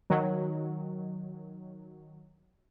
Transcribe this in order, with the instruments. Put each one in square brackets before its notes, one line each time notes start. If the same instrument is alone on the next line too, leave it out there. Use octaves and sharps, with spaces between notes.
[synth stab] D#3 F#3